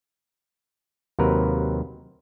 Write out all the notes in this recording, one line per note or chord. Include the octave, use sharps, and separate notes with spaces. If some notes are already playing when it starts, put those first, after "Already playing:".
D#2 C3 F#3 A#4 B4